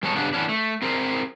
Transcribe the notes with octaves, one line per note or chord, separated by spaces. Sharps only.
G3 G#3 B3 C#5 A5
G2 C#3 B3 C#4 D4
E3 B3 C#4 D4
A3
C4 G#4 A#4 C5